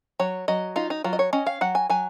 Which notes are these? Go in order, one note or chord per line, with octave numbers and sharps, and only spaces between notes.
F#3 C#5
F#3 D#5
D#4 F4
D#4
F#3 F4
D#5
C#5
C#4 D#5
F5
F#3 F#5
G#5
F#3 G#5